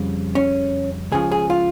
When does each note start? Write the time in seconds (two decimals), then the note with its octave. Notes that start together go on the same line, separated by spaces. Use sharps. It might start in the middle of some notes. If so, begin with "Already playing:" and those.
Already playing: F2 C#3 G3
0.35 C#4
1.12 C#2 C#3 F3 G#4
1.32 G#4
1.50 F4